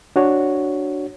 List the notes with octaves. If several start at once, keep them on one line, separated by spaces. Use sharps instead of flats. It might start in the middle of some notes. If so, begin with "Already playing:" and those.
D4 F#4 C#5